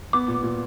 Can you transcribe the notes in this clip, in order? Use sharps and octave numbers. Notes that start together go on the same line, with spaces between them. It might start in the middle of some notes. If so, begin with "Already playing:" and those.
B3 D6
A#2
A#2